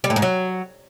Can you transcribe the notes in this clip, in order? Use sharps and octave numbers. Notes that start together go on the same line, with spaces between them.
G3
A2
G#2
F#3